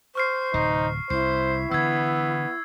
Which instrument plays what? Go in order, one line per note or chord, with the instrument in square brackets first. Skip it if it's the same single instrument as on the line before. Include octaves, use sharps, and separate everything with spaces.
[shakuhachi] C5 [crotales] C#6 F6 C7
[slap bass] D1 C3 [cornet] D#4
[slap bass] C2 [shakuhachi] E4 [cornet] C5 [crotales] C7
[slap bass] D3 E3 [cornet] B3 [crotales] E6 G#6